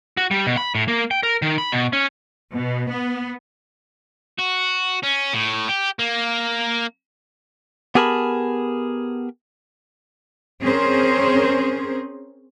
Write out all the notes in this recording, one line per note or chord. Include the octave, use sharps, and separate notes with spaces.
F#4
G3
B2
B5
A2
A#3
G5
A#4
D#3
B5
B2
C#4
B2
B3
F#4
C#4
A2
G4
A#3
B3 G4 G#4 A#4 A5 B5
C4 C#4 G#4 A#4 C5